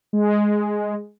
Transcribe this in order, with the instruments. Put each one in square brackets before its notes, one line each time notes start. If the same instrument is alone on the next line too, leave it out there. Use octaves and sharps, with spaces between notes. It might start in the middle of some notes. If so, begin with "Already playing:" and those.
[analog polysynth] G#3